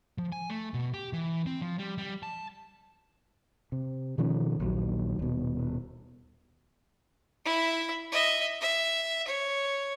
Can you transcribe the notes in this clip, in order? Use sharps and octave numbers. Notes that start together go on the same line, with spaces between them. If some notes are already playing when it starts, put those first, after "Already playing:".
F3
G#5
A3
B2
G4
E3
C4
F3
G3
G3
A5
C3
B2 D#3 F3 C#4
A#1 D#2 F#3
D#1 B2
E4 E5
D#5 E5
E5
C#5